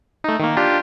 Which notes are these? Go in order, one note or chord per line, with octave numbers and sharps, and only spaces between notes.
A3 D#4
D#3 A#3
D4 F4 G4